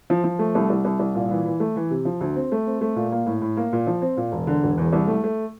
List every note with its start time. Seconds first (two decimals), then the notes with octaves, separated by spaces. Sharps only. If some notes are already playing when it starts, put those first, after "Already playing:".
0.10 F3
0.24 F3
0.39 A3
0.55 C2
0.70 C2
0.85 C2
0.99 C2
1.15 A#2
1.31 E3
1.45 E3
1.60 A3
1.76 E3
1.91 C3
2.05 F3
2.21 D2
2.36 C4
2.52 A3
2.67 C4
2.81 A3
2.96 A#2
3.12 A#3
3.26 A2
3.41 A2
3.57 A#3
3.72 A#2
3.87 F3
4.02 C4
4.17 A#2
4.32 E1
4.47 D3
4.63 E1
4.77 E2
4.93 C2
5.07 A3
5.24 A3